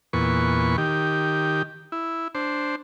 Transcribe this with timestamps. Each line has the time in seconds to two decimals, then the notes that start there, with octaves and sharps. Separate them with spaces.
0.13 E2 A#2 B4 C#6
0.78 D#3 G4
1.92 E4
2.35 D4 C5